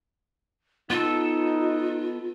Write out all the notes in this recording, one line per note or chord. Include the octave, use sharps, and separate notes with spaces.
B3 D#4 F4 A4